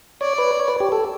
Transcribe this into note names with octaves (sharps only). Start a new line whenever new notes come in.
C#5 D5
B4
C#5
B4
G4
A4